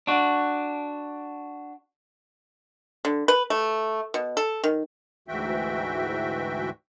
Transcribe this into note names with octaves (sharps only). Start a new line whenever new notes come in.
D4 F#4
D3
B4
A3
B2
A4
D#3
D2 G#2 E3 F#4 E5 G5